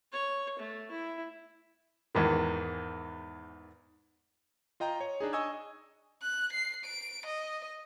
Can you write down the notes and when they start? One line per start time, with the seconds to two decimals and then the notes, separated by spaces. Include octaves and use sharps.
0.13 C#5
0.59 A3
0.91 E4
2.15 E2 G#2 D#3
4.80 F4 D#5 G5 A#5
5.00 C#5
5.20 D4 D#4 G#4
5.33 D#5 G#5 C#6 D#6 E6 G#6
6.22 F#6
6.53 C7
6.85 D7
7.26 D#5